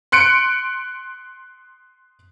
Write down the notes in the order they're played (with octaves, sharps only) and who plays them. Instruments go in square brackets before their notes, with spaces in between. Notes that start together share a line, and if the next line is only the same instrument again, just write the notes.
[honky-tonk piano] C6 F#6 C#7 D7